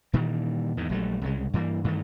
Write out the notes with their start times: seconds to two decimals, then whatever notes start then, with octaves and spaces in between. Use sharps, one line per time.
0.13 A#2 D#3 E3 G3
0.77 E2 G#2 D#3
0.89 A#1 F#3 G3 A3
1.21 C2 C#3 G#3
1.54 G2 E3 G3 A#3
1.84 G2 D#3 E3 A3